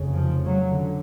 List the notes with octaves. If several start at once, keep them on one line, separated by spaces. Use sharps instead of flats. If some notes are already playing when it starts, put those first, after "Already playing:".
Already playing: F1 F2 C#3
F3
F#3
D3